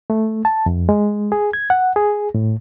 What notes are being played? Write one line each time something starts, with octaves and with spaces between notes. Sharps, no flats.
A3
A5
F2
G#3
G#4
G#6
F#5
G#4
A2